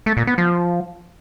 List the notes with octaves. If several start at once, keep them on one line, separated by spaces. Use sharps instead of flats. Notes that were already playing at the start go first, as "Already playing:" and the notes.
A3
A#2
B3
F3